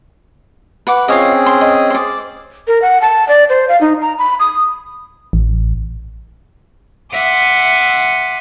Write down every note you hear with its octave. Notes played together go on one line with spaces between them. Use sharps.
B4 F#5 D6
C4 C#4 F4 G#4 C#5 D#5
C6
D#5
C5 D5
A#4
F#5
A5
D5
C5
F5
D#4
A#5
B5
D#6
A1
E5 F#5 C6 D6 D#6